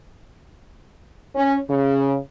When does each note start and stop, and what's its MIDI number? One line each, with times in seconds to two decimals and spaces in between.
1.35 1.56 61
1.70 2.16 49